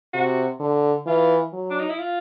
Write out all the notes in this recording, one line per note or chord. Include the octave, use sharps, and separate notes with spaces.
C3 F#4
D3
E3 F4
F#3
D4
D#4
E4
F4